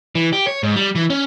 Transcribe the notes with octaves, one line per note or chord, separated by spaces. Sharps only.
E3
G4
C#5
G#2
G3
E3
C#4